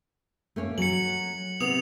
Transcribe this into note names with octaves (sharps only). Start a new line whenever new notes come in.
A3 A#3 C#4
F#3 C#7 F#7
C3 B3 C4 D#6 F7